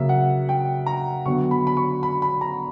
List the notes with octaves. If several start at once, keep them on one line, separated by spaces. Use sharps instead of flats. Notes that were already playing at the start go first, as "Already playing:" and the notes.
Already playing: C#3 F#3 A#3 C#4 E5
F#5
G5
A#5
D3 F#3 B3 C#6
B5
B5
C#6
B5
B5
A#5